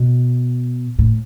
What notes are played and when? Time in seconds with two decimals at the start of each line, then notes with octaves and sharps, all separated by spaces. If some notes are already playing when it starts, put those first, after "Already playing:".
Already playing: B2
0.99 A2